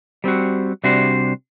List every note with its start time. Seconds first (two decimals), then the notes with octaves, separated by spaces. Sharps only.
0.24 G3 C4 F#4
0.84 C3 G3 D4 F#4 C5